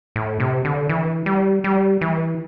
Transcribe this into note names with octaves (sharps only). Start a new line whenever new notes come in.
A2
C3
D3
E3
G3
G3
E3